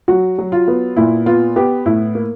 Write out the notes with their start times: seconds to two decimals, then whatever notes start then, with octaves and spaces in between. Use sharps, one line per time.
0.08 F#3 F#4
0.39 F#3
0.52 F4
0.68 B3
0.96 A#2 E4
1.26 B3 F4
1.56 B3 G4
1.86 A2 E4
2.15 A#3